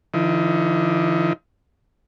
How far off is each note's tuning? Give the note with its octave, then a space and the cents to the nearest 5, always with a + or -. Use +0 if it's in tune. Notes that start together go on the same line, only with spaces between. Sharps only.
D3 +25 F3 -45 D#4 +30